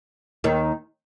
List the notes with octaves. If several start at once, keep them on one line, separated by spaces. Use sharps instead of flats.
D#2 D#3